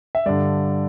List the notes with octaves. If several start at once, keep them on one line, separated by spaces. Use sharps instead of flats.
E5
G2 D3 D5